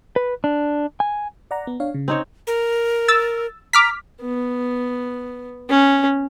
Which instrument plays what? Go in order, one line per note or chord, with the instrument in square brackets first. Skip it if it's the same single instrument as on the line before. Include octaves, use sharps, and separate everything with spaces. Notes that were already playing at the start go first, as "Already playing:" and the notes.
[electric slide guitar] B4
D4
G#5
[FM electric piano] D5 F#5 A#5
B3
D4 C#5 F5
C#3
[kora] C4 D#4 C#5
[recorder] A#4
[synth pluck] E6 A6
[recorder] A#5 [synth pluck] D6 F6 B6
[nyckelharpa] B3
C#4